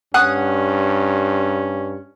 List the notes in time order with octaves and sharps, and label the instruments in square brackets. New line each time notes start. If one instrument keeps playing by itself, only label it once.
[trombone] G2 [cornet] C#4 [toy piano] F#5 [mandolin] C#6 D#6 F#6